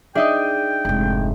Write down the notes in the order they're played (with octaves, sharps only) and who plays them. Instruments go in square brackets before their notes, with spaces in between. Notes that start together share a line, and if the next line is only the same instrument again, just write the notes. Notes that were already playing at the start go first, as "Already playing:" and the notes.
[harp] D4 D#4 D#5 [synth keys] G#4 E5 [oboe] G5
[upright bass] F1 G#2